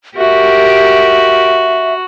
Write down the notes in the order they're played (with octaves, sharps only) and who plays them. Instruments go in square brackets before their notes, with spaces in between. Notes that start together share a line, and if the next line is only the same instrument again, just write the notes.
[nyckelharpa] F#4 [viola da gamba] G4 A#4 [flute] E5